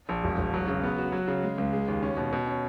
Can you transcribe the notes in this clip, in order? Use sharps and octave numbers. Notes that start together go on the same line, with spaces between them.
A#1
E1
E1
F#3
C#3
B3
F#4
F#3
C#3
G#3
C#2
G#3
D#2
C#4
B2
B2
C#4